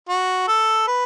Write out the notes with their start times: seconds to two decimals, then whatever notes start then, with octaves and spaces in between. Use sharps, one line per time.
0.09 F#4
0.48 A4
0.87 B4